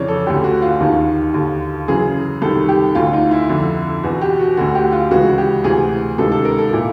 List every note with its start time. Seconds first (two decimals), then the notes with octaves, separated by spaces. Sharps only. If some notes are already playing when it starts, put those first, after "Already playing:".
Already playing: F2 C#3 E3 C#5 D5
0.08 A4
0.27 D2 D3 G4
0.44 F#4
0.62 F4
0.80 D#2 D#3
1.34 D#2 D3
1.88 F#2 C#3 E3 G#4
2.42 C2 C3 D#3 A4
2.69 G4
2.95 D2 D3 F4
3.13 D#4
3.31 E4
3.49 F2 D3
4.03 E2 B2 F#4
4.21 G4
4.39 F#4
4.57 D2 D3 F#4
4.75 G4
4.92 F4
5.11 C#2 C#3 E3 F#4
5.38 G4
5.64 D2 C3 E3 G#4
6.18 C#2 C3 D#3 A4
6.32 A4
6.45 A#4
6.58 A4
6.73 A#2 E4